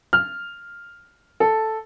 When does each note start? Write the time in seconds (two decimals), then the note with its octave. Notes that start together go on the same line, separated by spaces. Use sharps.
0.13 F6
1.40 A4